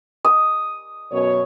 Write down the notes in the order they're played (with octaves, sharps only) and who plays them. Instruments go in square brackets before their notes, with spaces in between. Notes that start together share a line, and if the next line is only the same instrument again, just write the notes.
[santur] D#6
[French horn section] F#2 B2 C#5